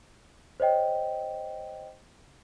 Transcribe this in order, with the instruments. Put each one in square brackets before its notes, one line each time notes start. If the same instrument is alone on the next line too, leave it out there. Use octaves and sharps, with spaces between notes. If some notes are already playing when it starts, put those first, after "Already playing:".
[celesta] C5 C#5 D#5 G5